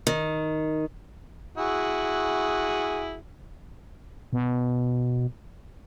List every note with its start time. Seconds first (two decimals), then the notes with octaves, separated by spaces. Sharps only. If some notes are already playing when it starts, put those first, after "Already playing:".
0.07 D#3
1.58 E4 F#4 G#4
4.33 B2